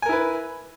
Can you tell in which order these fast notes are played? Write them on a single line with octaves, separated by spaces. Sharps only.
G#5 A#4 E4 B4